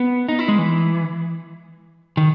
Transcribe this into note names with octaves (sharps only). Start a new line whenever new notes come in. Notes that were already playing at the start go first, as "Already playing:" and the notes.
Already playing: B3
D#4
E4
G#3
E3
D#3